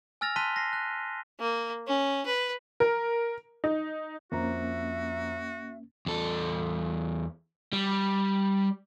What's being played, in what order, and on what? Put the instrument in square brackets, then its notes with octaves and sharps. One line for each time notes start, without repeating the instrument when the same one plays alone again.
[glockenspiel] G#5 E6 F6 A6 A#6 F7
A5 C6 F#6 B6 D#7 G7
A#6 C7
F#6
[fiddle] A#3
C#4
B4
[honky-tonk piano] A#4
D#4
[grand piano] F2 C5 A#5 [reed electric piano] A#3 C#4 [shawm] F#4 [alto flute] E5
[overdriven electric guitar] E2 A4
G3